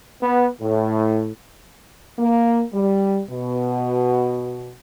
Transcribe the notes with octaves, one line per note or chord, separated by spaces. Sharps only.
B3
A2
A#3
G3
B2